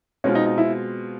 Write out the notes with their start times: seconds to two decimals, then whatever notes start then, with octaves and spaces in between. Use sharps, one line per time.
0.24 B2 G#3 C4 C#4 F4
0.35 D#4
0.46 D#4
0.58 E4